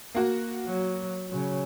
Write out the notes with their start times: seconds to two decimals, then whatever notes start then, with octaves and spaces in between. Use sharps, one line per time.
0.15 A#3 F#4
0.66 F#3
1.30 C#3 F#3